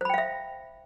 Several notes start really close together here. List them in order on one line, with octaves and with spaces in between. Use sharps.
C5 B5 G5 F5 E5